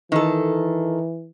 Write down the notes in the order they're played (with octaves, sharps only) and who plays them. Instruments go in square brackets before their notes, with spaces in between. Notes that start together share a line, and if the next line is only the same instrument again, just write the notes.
[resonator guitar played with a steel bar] D#3 A4 [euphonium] E3